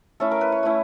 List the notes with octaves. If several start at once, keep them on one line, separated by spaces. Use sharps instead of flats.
A3 C#4 E4 A4
A#4
B4
C#5
A3 C#4 E4